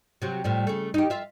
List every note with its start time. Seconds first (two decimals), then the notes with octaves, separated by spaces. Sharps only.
0.22 C3 F#3
0.44 A2 F3 G3
0.67 C#3 A3
0.94 D#4 G4
1.10 F4 E5